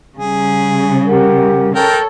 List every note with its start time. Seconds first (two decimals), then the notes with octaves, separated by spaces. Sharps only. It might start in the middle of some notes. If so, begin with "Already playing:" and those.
0.18 C#3 G3 G#4
1.08 G4 A#4 F#5
1.75 A4 A#4 C#5 G5